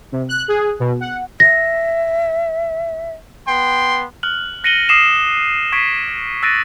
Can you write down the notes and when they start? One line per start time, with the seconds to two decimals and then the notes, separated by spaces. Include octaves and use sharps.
0.12 C3
0.29 F#6
0.48 G#4
0.80 B2
1.01 F#5
1.40 E5 A#6
3.48 B3 G5 C6
4.23 F6 F#6 F#7
4.64 F#6 A#6 C#7 D#7 F#7 G7
4.89 D6 D#6 C7 D#7 E7 F#7
5.72 C#6 G#6 B6 C7 D7 D#7
6.43 E6 F#6 A6 A#6 D7 D#7